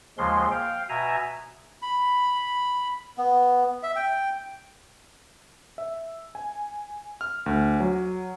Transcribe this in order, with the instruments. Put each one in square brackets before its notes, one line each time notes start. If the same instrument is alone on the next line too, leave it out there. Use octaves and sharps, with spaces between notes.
[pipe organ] D#2 C#3 F3 G#3 C6
F5 G5
B2 E5 G#5 A#5
[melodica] B5
B3
E5
G5
[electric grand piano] E5
G#5
F6
D2
F#3